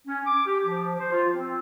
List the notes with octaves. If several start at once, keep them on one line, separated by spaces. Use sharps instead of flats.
C#4
D6
G4
F3
C5
F4
C4